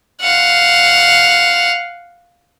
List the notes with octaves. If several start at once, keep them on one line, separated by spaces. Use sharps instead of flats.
F5 F#5